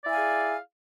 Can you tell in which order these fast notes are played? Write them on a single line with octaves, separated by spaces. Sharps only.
D5 E4 G#5 F5 G#4